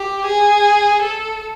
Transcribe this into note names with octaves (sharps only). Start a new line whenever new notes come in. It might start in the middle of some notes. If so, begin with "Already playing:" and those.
Already playing: G4
G#4
A4